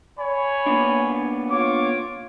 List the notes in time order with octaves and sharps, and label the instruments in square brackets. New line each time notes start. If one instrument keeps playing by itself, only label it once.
[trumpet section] C#5 G#5 B5
[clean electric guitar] A#3 B3 D4
[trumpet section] F4 C#5 D6